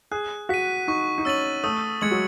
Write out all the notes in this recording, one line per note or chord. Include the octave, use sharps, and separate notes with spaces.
G#4 F#6
F#4 B6 D#7
D#4 C#6
D#4
C#4 E6 A6 D#7 F#7
A3 D#6
G#3 G#6 C#7 F#7
F#3